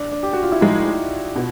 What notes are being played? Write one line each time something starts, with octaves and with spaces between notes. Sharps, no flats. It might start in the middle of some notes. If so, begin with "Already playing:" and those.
Already playing: D4
D4
G4
F#4
F4
E4
A2 F3 G#3 D#4
B2 F4